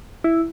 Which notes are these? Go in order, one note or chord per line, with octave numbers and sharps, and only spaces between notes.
E4